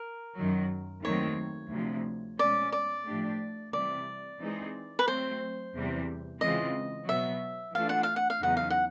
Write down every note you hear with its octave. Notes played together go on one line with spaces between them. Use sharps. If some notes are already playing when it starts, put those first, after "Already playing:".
Already playing: A#4
F#2 D#3 F#3
D#2 D#3 F#3 A3 C4 C#5
D2 C3 F3
B2 G#3 C#4 D5
D5
A2 F3 A3 D4 G4
C3 E3 G3 D5
E3 G#3 C4 D#4 G#4
B4
F#3 A3 C4 C5
E2 C3 E3 G3
C#3 E3 G#3 C4 F4 D#5
B2 F#3 B3 E5
E3 A3 D4 F4 A4 F5
F#5
F5
F#5
F5
E2 C#3 F#3 B3 D#4 F#5
F5
F#5